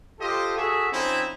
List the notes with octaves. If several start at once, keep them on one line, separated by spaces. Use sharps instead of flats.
F4 G4 A4 C5 D#5
F#4 G#4 A4 E5
F3 C4 C#4 D#4 E4